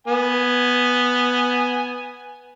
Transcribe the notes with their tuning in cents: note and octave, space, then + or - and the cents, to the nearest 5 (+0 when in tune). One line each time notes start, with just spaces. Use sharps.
B3 +0 G#5 +0